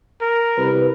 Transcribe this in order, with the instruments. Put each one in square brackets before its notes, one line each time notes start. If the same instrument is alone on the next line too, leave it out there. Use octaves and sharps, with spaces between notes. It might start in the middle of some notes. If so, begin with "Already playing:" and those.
[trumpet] A#4
[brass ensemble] C2 B4